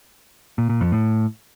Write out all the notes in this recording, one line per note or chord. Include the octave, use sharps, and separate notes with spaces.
A#2
A#2
F2
A2